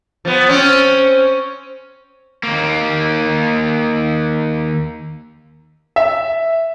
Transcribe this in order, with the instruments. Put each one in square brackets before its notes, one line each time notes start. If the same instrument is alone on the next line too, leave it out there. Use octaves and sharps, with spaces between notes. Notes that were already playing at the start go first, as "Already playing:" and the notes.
[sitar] F3 B3
C4 C#4
[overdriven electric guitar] D#2 A#3
[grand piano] E5